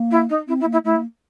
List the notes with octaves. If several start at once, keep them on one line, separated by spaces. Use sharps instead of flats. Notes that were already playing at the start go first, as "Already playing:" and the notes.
Already playing: A#3
E4
D#4
C4 E4
E4
A#3
E4
A3 E4
A#3